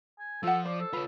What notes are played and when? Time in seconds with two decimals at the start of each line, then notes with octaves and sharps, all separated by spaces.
0.19 G#5
0.43 F3 F4 A4 F#5
0.65 C5 D5
0.80 A4
0.93 F4 B4 C#5